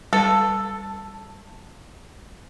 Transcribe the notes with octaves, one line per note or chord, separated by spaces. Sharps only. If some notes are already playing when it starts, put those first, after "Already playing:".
G3 A4 B4 A5